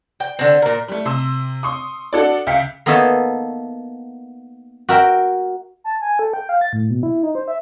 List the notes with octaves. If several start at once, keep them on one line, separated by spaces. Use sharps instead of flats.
G5
D3 C4
A#2 A#4
G3 A3
C3 C6 E6
C6 C#6 D#6
D4 F#4 A4 D5
C#2 E5 F5 G5 B6 C#7
A#3 B3 D#4 A4 C#5 E5
F#4 A#4 E5 G5
A5
G#5
A4
G5
F5
A6
A2
B2
E4
D#4
C5
E5